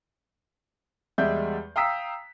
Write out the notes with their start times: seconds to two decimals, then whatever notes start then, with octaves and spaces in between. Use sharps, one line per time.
1.18 E2 G3 G#3 D5 E5 G6
1.76 F5 G5 A#5 D#6 E6 B6